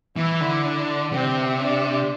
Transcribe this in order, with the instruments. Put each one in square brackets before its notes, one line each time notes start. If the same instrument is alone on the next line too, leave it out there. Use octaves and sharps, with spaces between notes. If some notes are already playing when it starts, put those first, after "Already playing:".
[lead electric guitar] E3 [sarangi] E4
[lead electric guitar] D3
[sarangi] D4
[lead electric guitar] C3 [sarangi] C4
[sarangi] D4